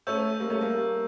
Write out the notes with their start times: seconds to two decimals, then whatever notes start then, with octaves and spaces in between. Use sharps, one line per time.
0.07 A3 C#4 C#6 E6 G6
0.40 G3 A#3
0.50 A3 C#4
0.61 G3 A#3